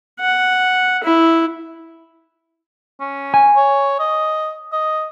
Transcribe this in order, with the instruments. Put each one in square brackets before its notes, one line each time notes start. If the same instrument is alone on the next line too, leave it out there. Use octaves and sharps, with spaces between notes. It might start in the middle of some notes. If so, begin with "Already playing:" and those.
[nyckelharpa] F#5
E4
[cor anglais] C#4
[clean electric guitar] G#5
[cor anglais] C#5
D#5
D#5